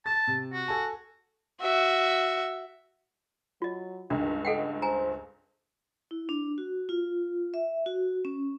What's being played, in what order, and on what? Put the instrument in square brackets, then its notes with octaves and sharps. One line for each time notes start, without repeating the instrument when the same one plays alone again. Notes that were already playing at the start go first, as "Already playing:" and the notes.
[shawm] A5 [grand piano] A6
[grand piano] C3
[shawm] F#4
[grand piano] A4 G#5 A5
[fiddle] F#4 E5
[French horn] F#3 [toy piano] F4 D#5
[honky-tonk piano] C#2 G2 [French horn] D#3 [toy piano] D4
[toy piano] A4 F#5 G5 [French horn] D#5
[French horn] C5 [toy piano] G#5 A#5
[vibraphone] E4
D4
F#4
F4
E5
F#4
C#4